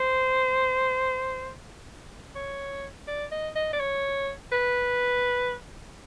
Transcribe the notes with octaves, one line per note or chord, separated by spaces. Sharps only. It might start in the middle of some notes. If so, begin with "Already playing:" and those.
Already playing: C5
C#5
D5
D#5
D#5
D5
C#5
B4